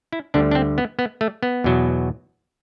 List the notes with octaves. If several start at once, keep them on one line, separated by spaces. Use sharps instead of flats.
E4
D2 D3 G3 D4
D4
C4
B3
B3
A3
B3
E2 B2 F#3